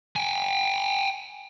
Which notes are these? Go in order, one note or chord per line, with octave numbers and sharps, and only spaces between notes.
G5 G#5